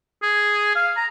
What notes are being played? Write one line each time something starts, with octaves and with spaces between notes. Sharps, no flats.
G#4
F5
A#5